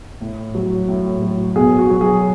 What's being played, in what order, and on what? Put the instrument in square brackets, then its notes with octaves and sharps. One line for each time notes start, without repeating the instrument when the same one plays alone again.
[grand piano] A2
F#3
A2
F#3
B2 G#4
F#4
F#3
G#4